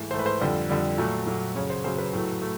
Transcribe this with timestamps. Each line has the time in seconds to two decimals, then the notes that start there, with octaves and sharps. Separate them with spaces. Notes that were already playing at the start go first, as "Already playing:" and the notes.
Already playing: G#2 E3 A3 E5
0.11 G#2 E3 A3 C5
0.19 B4
0.26 C5
0.40 F2 D3 G3
0.70 F2 D3 G3
0.98 A#2 F#3 A3
1.26 A#2 F#3 A3
1.55 F#2 C#3 F#3 C#5
1.70 C5
1.84 F#2 C#3 F#3 C5
1.98 B4
2.13 A2 F#3 A3
2.42 A3